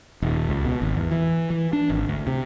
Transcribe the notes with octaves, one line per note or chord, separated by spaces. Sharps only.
D#1
C#2
B2
G#1
E2
E3
E3
D4
G#1
D2
C3